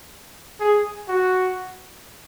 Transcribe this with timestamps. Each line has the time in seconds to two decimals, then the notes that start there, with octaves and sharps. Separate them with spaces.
0.60 G#4
1.09 F#4